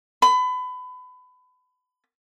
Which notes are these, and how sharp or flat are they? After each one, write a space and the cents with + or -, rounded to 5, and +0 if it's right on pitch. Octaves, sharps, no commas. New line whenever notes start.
B5 +30